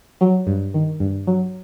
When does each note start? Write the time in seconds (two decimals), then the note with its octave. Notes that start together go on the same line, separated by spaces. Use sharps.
0.21 F#3
0.47 G2
0.74 D#3
1.00 G2
1.27 F#3